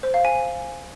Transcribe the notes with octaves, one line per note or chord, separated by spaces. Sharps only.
C5
F5
G#5